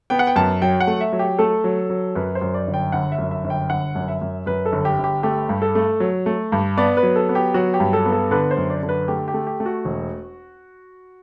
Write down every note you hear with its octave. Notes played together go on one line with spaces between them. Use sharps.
B3 G5
F#5
G5
F#2 A5
F#3 G5
F#5
A3
E5
F#3
G4
A3 A4
F#3
F#3
F#2 B4
C5
F#2
D5
G1
G5
G1 F#5
E5
F#2
E5
G1
G5
G1 F#5
F#2
E5
F#2
F#2 B4
A4
G1
G4
G1
G4
A3 G4
G2
A4
A3
F#3
A3
G2
B3 D5
B4
F#3
A4
B3
G4
F#3 F#4
G4
G2
A4
B3
A4
D3 B4
C5
F#2
D5
D3
B4
A3 G4
G4
A3
G4
A3
F#4
E1